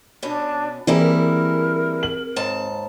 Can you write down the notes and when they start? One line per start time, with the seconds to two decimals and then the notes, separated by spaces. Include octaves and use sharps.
0.22 B2 C#4 D4
0.87 E3 G3 A#3 C4 E4 G#4 A#4
2.03 F#7
2.36 D#2 G#2 A5